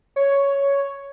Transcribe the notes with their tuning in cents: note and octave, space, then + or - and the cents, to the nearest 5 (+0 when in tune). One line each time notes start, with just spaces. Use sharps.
C#5 +5